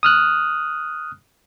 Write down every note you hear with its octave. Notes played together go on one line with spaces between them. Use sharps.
D#6 F6 F#6